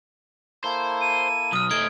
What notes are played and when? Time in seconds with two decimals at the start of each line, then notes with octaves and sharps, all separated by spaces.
0.64 A#3 E4 A4 C5
1.01 D#7
1.53 B1 D#6 F6
1.71 A3 D#4 G#6 D7